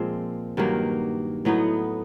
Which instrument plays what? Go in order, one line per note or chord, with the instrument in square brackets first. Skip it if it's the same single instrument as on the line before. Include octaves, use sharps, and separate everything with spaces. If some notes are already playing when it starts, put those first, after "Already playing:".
Already playing: [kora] A#2 F3 G#3 C4
G2 D#3 F#3 A#3
A2 F#3 B3 D#4